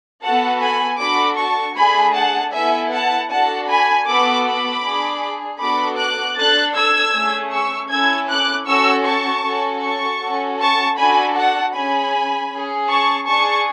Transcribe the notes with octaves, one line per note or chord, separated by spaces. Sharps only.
B3 F#4 A4 F#5 A5
G#5 B5
D4 F#4 A4 B5 D6
A5 C#6
A3 D4 G#4 G#5 B5
F#5 A5
B3 E4 A4 E5 G#5
F#5 A5
D4 F#4 A4 F#5 A5
G#5 B5
B3 F#4 A4 B5 D6
B5 D6
D4 G#4
B3 D4 F#4 A4 B5 D6
D6 F#6
D4 A4 F#6 A6
E6 G#6
A3 C#4 G#4
C#6 E6
C#4 E4 A4 E6 G#6
D6 F#6
C#4 F#4 A4 C#6 E6
A5 C#6
C#4 F#4 A4
A5 C#6
C#4 F#4 A4
A5 C#6
D4 F#4 A4 G#5 B5
F#5 A5
C#4 G#4 G#5 B5
C#4 G#4
A5 C#6
D4 G#4 A5 C#6